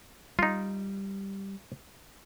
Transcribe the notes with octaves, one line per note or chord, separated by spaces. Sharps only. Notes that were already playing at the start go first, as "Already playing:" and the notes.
G3 D#4 F4